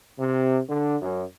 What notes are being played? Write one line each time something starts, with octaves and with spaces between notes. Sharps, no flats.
C3
D3
F#2